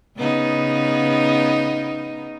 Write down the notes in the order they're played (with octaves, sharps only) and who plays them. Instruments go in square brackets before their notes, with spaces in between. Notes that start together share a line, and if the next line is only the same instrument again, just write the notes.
[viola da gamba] C#3 B3 D#4